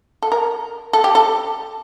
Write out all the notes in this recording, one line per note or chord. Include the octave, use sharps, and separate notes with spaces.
A4
A#4
A4
G4
A4